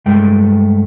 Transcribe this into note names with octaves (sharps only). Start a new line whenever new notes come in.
G2 G#3 A3 G5